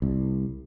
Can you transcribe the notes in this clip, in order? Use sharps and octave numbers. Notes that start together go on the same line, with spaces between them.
C2